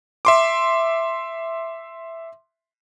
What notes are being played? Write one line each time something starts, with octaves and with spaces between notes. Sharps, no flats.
E5 C6 D6